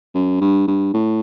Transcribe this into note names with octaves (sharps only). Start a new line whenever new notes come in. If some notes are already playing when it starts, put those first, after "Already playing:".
F#2
G2
G2
A2